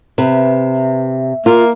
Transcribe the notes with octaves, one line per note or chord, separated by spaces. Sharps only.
C3 B4 E5
A#3 F4